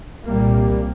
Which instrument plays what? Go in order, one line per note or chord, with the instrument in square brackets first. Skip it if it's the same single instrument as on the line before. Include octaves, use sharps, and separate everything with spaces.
[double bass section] C2 A#2 G3 A#3